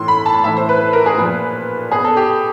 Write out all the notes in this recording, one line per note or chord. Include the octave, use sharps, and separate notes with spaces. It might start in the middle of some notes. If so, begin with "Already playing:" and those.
Already playing: A2 E3 C6
B5
A5
A2 E3 E5
C5
B4
A#4
G#4
A#2 F3 B4
B2 G#4
A4
G4